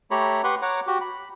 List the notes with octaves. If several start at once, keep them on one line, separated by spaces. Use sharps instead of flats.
A3 G4 C#5 A#5 B5
G4 B4 F#5 C6 C#6
C#5 F#5 A#5 D6
F#4 G4
B5